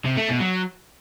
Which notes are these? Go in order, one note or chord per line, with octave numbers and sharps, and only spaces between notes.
C3
A3
B2
F#3